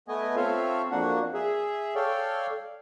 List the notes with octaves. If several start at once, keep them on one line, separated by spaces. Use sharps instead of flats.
A3 B3 D#5 G#5
C4 F4 A4 C#5 E5 F5
F2 A#3 D4 F#4 F#5
G#4 E5
A4 C#5 D5 F5 G5